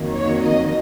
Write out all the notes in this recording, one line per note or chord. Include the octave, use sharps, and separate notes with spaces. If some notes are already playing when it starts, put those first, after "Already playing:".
Already playing: F2 D#3 F#3 A#3
C#5
D#5